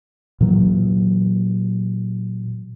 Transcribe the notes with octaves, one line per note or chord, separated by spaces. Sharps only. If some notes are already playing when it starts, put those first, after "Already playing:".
A#2 E3 F#3